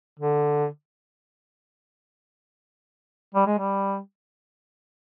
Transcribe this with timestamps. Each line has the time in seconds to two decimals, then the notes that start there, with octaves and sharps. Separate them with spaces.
0.19 D3
3.35 G3
3.47 G#3
3.59 G3